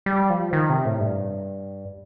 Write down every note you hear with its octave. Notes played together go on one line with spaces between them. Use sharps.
G3
F3
D#3
C3
A2
G2